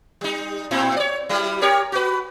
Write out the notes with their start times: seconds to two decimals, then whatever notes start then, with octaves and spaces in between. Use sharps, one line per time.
0.21 G3 D#4
0.71 A2 C4 E4
0.97 C#5 D5
1.29 F#3 G3 E4
1.61 G4 A#4 C#5
1.92 F#4 B4